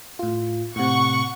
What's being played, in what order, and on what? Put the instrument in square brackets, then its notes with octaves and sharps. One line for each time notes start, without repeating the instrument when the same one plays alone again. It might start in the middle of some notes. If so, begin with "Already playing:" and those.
[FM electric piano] A2 F4
[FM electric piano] A2 C3 [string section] F#5 C#6